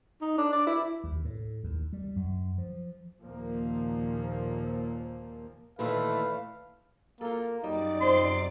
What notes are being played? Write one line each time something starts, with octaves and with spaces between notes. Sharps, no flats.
D#4
D4
D5
E4
D#2
A2
D#2
G3
F#2
F3
D#2 A#2 F3 A#3
A#2 D#3 E3 A3 B4 F5
A#3 F4 A4
F#2 G3 D#4 D5 D6
C3 F3 C4 C6